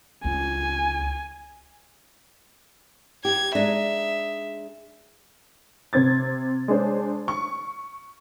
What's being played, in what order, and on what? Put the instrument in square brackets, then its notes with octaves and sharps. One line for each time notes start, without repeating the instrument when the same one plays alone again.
[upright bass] C#2 F4 [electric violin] G#5
[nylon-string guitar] G4 [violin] G#6
[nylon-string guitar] G#3 D4 D#4 [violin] E5
[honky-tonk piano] C3 C4 G#6 A6
G#3 D4 C5 C#5
C#6